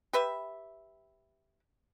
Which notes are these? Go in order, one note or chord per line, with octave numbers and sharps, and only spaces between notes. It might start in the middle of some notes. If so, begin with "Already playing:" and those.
G4 B4 E5